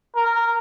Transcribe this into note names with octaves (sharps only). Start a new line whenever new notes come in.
A#4